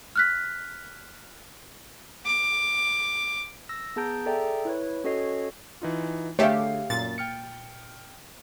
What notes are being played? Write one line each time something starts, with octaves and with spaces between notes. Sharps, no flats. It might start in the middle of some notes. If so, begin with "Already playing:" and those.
F6 F#6 B6
D6
E6 A#6
B3 G#4 A5 A#5 G6 D7
G#4 A4 D5 E5 G5 A#5
E4 B4 C#5
C#4 F#4 A4 C#5 D#5 C7
E3 D#4 F4
D3 A3 G4 G#4 C#5 E5 F5 C7
F#2 A#2 A6
G5 F6 C#7